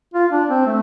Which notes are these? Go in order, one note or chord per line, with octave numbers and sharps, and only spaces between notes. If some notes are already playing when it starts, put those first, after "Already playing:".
F4
D4
C4
A3